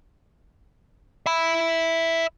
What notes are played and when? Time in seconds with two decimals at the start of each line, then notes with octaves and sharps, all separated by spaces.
1.26 E5 B5